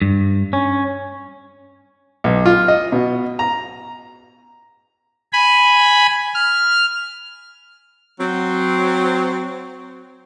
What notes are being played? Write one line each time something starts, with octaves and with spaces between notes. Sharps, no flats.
G2
C#4
B1
F4
D#5
B2
A#5
G#5 B5
F6
F#3 C4